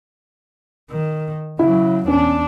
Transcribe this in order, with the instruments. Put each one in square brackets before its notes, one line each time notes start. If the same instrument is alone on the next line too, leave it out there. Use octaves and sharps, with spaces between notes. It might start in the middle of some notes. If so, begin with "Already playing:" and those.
[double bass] D#3
[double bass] C#3 F#3 [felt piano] E4
[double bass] E2 D4 [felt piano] C#4